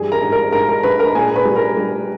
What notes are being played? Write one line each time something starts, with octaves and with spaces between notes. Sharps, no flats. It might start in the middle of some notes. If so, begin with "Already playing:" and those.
Already playing: G2 E3 G3 G#4 G#5
A#4 A#5
G#2
A#4 A#5
G#2 A#4 A#5
A#4 A#5
G#2 B4 B5
A#4 A#5
A#2 G#4 G#5
B4 B5
G3
A#4 A#5
G3